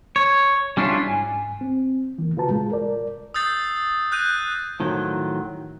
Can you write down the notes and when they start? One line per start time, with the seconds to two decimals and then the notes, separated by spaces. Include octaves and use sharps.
0.16 C#5
0.77 G3 C#4 D4 E4 F4
1.08 G#2 G#5
1.61 C4
2.18 E3 A#3
2.36 C#3 F4 F#4 B4 A5 A#5
2.49 A#2 G#3 F4
2.72 A#4 D5
3.34 D#6 E6 G6 A6 C7
4.12 D#6 F#6 G6 A#6 D#7
4.80 A2 D#3 F3 F#3